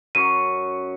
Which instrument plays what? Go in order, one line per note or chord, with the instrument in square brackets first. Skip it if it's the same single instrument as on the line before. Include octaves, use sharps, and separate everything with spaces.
[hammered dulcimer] F#2 C#6 [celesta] D#7